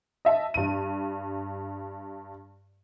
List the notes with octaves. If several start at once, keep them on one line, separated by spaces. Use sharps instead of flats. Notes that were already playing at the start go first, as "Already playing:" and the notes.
D#5 E5 A5
G2 D#7